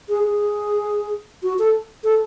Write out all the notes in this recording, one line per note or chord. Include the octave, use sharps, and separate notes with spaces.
G#4
G#4
F#4
A4
A4